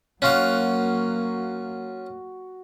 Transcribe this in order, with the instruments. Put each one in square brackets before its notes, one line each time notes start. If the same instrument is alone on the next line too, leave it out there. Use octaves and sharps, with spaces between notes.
[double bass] F#3 A#3 [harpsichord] C#4 F4 F5 [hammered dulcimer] F#4 F#5